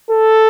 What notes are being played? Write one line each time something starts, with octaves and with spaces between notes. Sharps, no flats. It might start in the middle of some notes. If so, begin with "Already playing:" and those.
A4